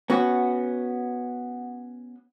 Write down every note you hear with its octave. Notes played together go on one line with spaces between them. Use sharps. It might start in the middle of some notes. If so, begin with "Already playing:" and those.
B3 C#4 F#4